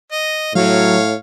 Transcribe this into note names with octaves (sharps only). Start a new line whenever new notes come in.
D#5
A2 F#3 C#5 F5